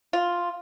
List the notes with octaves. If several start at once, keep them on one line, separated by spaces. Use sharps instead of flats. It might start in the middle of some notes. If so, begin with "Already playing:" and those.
F4